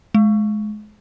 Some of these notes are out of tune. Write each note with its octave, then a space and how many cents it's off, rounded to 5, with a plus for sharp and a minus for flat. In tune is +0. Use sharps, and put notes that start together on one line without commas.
G#3 +30